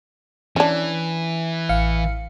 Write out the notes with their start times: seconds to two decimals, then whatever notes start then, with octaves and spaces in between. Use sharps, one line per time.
0.56 E3 C#4 D4
1.69 A1 F5 C#7